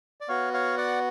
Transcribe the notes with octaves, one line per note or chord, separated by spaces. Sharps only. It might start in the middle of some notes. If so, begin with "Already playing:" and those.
D5
B3 F#4 C#5 F5
C#5 F5
D5 F#5